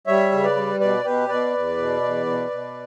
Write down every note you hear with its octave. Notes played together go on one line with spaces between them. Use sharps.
G3 C#5 E5
C#3
B4 D5
G3
B2 B4 D5
B2 G4 B4
B2 B4 D5
E2
B2
E2
B2
B2